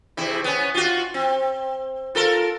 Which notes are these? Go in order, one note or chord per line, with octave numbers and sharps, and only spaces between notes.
E2 C3 E4
B3 C#4
F4 F#4
C4
F4 A4 A#4